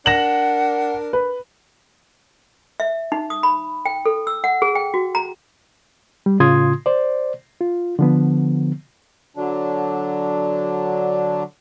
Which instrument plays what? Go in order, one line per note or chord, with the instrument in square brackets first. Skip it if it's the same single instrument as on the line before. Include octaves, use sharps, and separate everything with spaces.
[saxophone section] D4 A#4 [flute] F#5 [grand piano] A#6 E7 F#7
[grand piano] B4
[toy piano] E5
D#4
D#6
B5
G5
A4
E6
F#5
G#4
G5
F#4
A#5
[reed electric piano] G3
A2 C#3 F4 C6 D#6 G#6
C5 D5
F4
D3 F3 B3
[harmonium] D3 F#3 D4